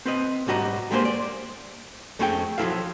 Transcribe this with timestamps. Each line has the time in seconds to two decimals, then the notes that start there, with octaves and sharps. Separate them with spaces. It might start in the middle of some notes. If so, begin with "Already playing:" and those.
0.06 C4 B4 D#5
0.47 B1 G#2 G3 F#4 D#5 A#5
0.91 G3 G#3 A#3 E4 B4 C5
1.05 D5
2.19 F2 A3 C#4 E4 G#4 G5
2.58 F3 F#3 G#3 E4 A4 F5